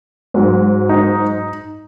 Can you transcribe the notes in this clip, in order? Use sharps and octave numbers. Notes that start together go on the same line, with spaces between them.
G#2 F#3
D#4